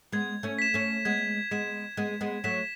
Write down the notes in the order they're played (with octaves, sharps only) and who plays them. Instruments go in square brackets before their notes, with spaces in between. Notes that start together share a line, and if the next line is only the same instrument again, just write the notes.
[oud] G#3 B3 [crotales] G#6
[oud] A3 C#4
[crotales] B6 E7
[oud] A3 C#4
[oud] G#3 B3 [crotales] G#6
[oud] G#3 B3 [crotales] B6 E7
[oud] G#3 B3 [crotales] G#6
[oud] G#3 B3
[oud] F#3 A3 [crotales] B6 E7